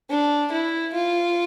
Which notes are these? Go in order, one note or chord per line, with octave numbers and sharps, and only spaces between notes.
D4
E4
F4